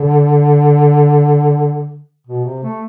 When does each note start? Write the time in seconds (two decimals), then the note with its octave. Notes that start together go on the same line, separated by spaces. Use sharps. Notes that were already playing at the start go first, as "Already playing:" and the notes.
Already playing: D3
2.27 B2
2.44 C3
2.63 A3